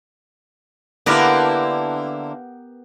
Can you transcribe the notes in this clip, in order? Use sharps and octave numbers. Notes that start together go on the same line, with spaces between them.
D3 A#3 B3 E4 G4 A#4